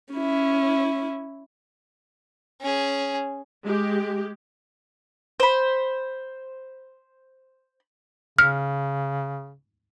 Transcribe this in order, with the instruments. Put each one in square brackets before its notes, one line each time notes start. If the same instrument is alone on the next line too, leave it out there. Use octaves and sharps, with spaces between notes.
[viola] C#4 E4
[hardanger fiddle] C#4 G#4
[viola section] G#3 G4
[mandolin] C5 B5
[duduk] C#3 [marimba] F6